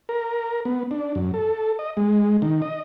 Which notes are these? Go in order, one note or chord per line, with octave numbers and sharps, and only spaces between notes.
A#4
B3
D4
F#2
A4
D#5
G#3
D#3
D#5